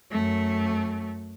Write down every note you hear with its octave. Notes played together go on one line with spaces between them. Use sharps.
F#2 A3